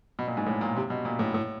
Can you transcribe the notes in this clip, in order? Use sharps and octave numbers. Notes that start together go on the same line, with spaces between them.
B2
A#2
G#2
A2
A#2
C3
B2
A#2
A2
A2